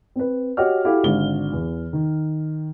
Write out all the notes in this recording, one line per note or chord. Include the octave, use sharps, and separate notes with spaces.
C4 B4
F#4 G4 C#5 D#5 G5 F6
E4 F#4 G4 A4 F5
G#1 D3 G7
E2
D#3